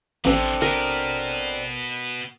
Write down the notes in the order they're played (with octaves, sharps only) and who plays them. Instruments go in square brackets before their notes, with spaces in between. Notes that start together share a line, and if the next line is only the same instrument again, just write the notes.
[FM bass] A1 [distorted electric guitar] C3 F3 [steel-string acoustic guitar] C4 D4 A4
[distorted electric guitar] B2 B3 [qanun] A#4